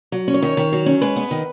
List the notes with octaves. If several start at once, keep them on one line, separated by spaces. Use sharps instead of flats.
F#3
C#4
C#5
D#3
D#3
F#3
C#4
G#3 B4
B3
D#3